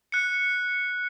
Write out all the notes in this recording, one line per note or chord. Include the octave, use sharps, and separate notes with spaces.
F#6 C#7